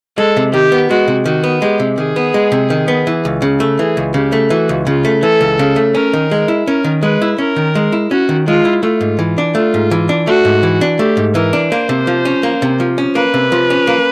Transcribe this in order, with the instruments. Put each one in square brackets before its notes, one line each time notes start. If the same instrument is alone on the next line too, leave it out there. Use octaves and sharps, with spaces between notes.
[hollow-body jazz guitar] G#3 [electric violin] A4
[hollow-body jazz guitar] C3
[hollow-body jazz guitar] D#3 [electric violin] G4
[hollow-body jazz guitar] B3
[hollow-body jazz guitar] G#3 [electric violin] F#4
[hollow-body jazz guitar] C3
[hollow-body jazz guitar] D#3 [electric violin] F#4
[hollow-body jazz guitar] B3
[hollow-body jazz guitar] G#3 [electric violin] G4
[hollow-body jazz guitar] C3
[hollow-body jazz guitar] D#3 [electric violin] G#4
[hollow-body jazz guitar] B3
G#3
C3
D#3
B3
E3
C#2
C#3
A3
[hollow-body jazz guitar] E3 [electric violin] G#4
[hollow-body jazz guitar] C#2
[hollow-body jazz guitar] C#3 [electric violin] G4
[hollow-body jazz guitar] A3
[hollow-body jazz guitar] E3 [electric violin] F#4
[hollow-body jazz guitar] C#2
[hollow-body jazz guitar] C#3 [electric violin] F4
[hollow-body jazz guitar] A3
[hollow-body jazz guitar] E3 [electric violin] A4
[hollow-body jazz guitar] C#2
C#3
A3
[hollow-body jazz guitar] C#4 [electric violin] A#4
[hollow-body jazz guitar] D#3
G#3
E4
[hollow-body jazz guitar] C#4 [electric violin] A#4
[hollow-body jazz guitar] D#3
[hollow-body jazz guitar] G#3 [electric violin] B4
[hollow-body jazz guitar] E4
[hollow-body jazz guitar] C#4 [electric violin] A#4
[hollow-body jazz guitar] D#3
G#3
E4
[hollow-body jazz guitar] C#4 [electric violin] F#4
[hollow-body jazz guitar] D#3
[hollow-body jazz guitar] G#3 [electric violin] F4
[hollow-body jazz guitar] E4
[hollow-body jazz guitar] A3 [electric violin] F4
[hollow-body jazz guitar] G#2
E3
D4
[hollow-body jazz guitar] A3 [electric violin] F4
[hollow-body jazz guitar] G#2
E3
D4
[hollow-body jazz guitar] A3 [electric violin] F#4
[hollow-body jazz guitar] G#2
E3
D4
[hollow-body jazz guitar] A3 [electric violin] G4
[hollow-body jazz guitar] G#2
[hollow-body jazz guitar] E3 [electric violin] A#4
[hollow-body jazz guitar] D4
[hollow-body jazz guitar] A#3 [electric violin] C5
[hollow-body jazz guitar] C3
F3
C#4
A#3
C3
F3
C#4
[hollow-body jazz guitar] A#3 [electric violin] B4
[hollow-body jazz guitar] C3
F3
C#4
A#3